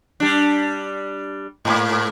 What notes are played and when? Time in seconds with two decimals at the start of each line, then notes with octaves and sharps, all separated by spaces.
0.20 G3 D4
1.65 G#2 A#3